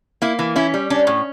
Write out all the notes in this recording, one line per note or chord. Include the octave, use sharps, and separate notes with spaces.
A#3 E4
E3
C#4 E4
G3
C#4 D4
A2